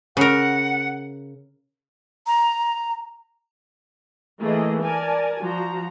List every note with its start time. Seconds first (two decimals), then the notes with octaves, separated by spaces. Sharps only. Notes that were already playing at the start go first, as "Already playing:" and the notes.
0.17 C#3 A#4 F#5
2.27 A#5
4.41 E3 A3 A#3 G#4 D#5
4.82 A#4 D5 G#5 A5
5.42 F3 F#4 A#5